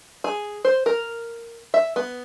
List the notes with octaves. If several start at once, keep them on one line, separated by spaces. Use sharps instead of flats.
G#4
C5
A#4
E5
B3